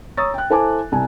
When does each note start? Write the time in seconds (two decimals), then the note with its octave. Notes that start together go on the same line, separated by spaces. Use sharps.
0.17 C#5 A#5 C#6 D#6 E6 A6
0.34 G5 F#6
0.50 E4 A4 C5 G#5 A5 D6
0.92 C2 G#5 A5